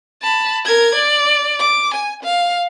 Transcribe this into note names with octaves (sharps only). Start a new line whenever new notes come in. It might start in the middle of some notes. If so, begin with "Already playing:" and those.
A5 B5
A#4 G#6
D5
D6
G#5
F5